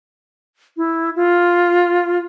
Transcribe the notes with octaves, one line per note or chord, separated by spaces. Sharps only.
E4
F4